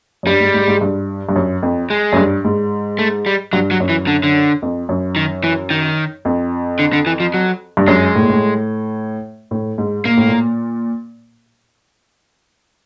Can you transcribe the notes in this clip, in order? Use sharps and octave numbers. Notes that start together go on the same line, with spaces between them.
F#2
G2 G3
G#2
G#2
G#2
G2
G2
F#2
F2
G#3
F#2
G2
G#2
A3
G3
G2 F#3
F#3
F#2
E3
D3
D3
F2
F#2
D#3
E3
D#3
F2
D3
D3
E3
F3
F#3
G2
F#2 G#3
A2
A#2
A2
A2
G#2
A#2 A#3
A2
A#2